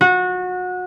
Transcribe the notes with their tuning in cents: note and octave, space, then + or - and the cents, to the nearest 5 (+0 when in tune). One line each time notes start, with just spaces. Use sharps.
F#4 -25